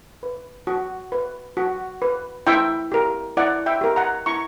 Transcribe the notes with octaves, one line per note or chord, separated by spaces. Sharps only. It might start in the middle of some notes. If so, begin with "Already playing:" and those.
B4
F#4
B4
F#4
B4
E4 E5 G5
G4 A#4
E4 D5 F#5
E5 G5
G4 A#4
F#5 A#5
E4 A#5 C#6